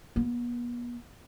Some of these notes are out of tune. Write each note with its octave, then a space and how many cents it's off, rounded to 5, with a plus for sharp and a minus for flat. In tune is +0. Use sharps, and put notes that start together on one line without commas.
B3 -40